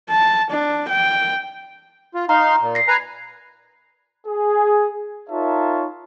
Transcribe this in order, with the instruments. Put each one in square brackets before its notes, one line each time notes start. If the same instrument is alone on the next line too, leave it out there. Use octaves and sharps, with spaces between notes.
[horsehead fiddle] A5
D4
G5
[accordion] F4
[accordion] D#4 F5 C6 [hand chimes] A#5
[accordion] A#2
[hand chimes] A#6 C7
[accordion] B4 G#5 A#5
[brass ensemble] G#4
D#4 F4 A#4 C#5 E5 A5